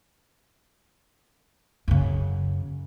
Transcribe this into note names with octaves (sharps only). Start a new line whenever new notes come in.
F#2 C#3